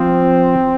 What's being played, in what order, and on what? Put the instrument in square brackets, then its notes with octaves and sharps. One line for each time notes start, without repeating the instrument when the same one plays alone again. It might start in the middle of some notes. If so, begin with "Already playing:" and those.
Already playing: [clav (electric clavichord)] F3 [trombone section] C4